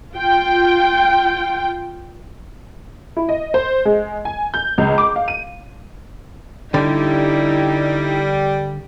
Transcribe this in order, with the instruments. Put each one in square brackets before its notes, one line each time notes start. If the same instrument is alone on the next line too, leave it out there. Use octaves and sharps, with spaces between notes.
[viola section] F4 G5
[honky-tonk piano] E4
D#5
C5
G#3
G#5
G6
C#2
D6
F5
D#7
[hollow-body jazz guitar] D3 [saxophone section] G3 [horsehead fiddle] D#4 E4